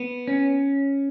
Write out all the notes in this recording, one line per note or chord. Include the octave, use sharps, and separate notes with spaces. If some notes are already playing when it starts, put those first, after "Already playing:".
Already playing: B3
C#4